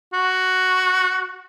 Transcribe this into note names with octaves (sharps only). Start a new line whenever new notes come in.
F#4